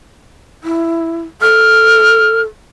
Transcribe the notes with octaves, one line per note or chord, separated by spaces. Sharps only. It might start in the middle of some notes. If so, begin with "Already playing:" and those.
E4
A4 F6